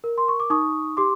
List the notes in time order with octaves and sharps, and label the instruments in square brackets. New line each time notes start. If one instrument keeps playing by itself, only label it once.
[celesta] A#4
C6
C#6
D6
D#4 C#6 D#6
G4 C6 D6